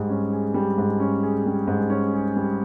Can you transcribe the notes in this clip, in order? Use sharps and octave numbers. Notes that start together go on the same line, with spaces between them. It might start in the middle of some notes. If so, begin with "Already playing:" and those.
Already playing: G#2 G3 G#4
C#4
G#4
G3
G#2
C#4
G#4
G3
G#2
C#4
G#4
G3